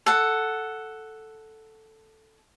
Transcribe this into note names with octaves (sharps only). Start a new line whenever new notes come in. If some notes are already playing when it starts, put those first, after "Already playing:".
A4 F#5